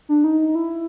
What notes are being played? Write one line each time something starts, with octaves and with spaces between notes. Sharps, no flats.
D4
D#4
E4